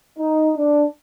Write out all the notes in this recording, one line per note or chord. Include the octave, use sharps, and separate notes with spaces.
D#4
D4